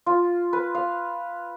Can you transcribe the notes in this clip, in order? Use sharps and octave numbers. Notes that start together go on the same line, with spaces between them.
F4
B4
F5